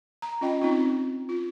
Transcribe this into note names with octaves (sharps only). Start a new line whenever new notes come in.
A#5
C#4 F4 D#5 G5
C4 D#4 F4
F4